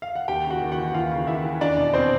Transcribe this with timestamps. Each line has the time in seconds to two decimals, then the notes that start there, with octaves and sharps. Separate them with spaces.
0.02 F5
0.15 F#5
0.28 D#2 G4 G5
0.45 C#3
0.50 F#4 F#5
0.61 D#2
0.72 F#4 F#5
0.77 E3
0.94 D#2 F4 F5
1.11 C#3
1.27 D#2 E4 E5
1.44 E3
1.61 E2 D4 D5
1.77 B2
1.93 B2 C4 C5